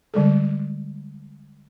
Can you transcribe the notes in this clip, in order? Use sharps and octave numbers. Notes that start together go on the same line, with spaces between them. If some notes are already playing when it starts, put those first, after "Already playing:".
D3 G3 G#3 A4